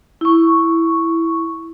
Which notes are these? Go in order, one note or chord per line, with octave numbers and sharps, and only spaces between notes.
E4 C#6